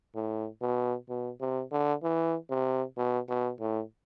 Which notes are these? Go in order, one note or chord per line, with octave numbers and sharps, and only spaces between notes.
A2
B2
B2
C3
D3
E3
C3
B2
B2
A2